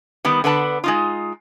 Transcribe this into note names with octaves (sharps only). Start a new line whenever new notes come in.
D#3 G3 B3
D3 B3 B4 A5
G#3 D#4 F4